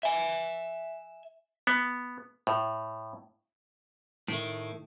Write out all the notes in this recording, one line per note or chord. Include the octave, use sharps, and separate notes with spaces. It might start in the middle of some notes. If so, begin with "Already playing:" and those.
E5 G#5
B3
A2
A2 D#3 A3